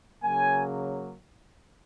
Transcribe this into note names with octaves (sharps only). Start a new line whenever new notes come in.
C#3 F#3 A#3 G#5